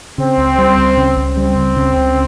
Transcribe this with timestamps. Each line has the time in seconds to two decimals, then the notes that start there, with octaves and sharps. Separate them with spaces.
0.18 C#3 C4
0.38 C#2
0.58 G3
0.77 C#2
0.97 C#3
1.17 C#2
1.37 G3 C4
1.57 C#2
1.76 C#3
1.96 C#2